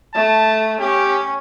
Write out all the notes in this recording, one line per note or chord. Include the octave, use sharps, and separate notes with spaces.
A3 A5
C#4 G4